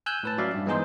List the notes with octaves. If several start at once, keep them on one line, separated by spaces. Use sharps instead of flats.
G#5 E6 F#6 G6
A2 B4 A5
F#3 C#4 D5 E5 F5
G2
E3 G#3 B3 D#4 G#4 C5